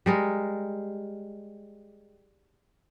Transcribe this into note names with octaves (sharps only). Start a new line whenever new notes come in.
G3 G#3 A#4